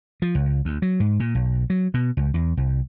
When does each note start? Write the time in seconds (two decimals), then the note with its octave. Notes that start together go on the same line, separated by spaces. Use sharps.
0.22 F3
0.35 C#2
0.65 D2
0.82 F#3
1.00 G#2
1.20 A#2
1.35 B1
1.70 F#3
1.94 B2
2.17 C#2
2.34 E2
2.57 C2